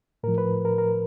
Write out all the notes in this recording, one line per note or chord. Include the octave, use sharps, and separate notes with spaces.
A2 F3 A#4
B4
A#4
A#4